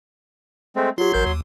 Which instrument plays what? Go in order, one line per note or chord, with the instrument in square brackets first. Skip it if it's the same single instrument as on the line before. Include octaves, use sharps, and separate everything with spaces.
[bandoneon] G#3 A3 C4
[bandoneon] F#3 C6 [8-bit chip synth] F4 G4
[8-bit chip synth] A1 A#4 G6
D#2